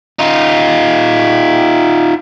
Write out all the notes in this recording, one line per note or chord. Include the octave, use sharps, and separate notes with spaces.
D#4 F4